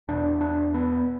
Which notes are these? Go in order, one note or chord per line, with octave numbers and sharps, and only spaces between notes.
E2 B2 D4
D4
B3